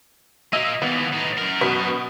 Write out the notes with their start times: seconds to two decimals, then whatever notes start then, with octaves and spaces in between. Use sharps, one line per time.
0.53 A#2 A#3 D#5 E6 D#7
0.82 D#2 E3 B3
1.13 A2 D#4
1.37 F#2 A#4
1.61 B2 B4 B6